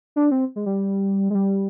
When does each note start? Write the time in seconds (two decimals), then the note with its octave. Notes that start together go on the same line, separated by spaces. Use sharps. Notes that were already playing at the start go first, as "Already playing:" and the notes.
0.16 D4
0.31 C4
0.56 G#3
0.66 G3
1.30 G#3
1.35 G3